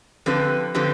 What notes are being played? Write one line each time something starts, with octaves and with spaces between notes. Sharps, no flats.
D3 F3 C4 G4 B4
D3 F3 C4 G4 B4